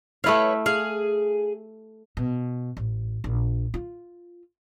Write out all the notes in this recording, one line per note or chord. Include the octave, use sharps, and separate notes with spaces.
A3 E4 B4 C#5 F5
G#4 F5
B2
A1
A#1
F4